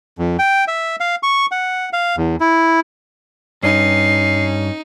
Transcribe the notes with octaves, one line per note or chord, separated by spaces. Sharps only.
F2
G5
E5
F5
C#6
F#5
F5
E2
E4
G2 C#4 D#4 C7